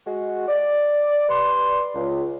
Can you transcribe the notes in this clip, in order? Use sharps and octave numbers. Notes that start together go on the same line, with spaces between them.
G#3 F#4
D5
G3 B4 D5 C6
C#2